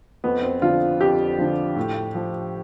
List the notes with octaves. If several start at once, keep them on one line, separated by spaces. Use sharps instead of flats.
F2 B3
C4
D3 F3 F4
F2 G4
D3 F3
A2
F3